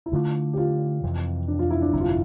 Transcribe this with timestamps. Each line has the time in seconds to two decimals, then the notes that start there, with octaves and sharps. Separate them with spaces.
0.06 E4
0.12 D2 D3 A3 D4 F4
0.53 G4
0.58 F4
1.04 F2 C3 E3
1.48 D4
1.59 F4
1.70 E4
1.82 D4
1.93 G1 F2 C3 G3 E4
2.01 F4
2.09 E4